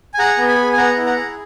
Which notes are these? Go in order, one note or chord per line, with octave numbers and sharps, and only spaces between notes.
G#5
G#4 F#5 A#5
B3
G#5 B5
G#4
G#5
B3 F#5 A#5
E4
F#5 A#5
G#4